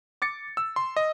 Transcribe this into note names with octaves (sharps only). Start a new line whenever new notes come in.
D6 A6 C#7
E6
C6
D#5